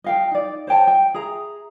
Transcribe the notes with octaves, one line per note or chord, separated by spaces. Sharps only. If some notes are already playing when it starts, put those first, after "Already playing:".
D#5 F5 G5
D#4 D5
C5 C#5 G5 A5
G5
G#4 E5 A#5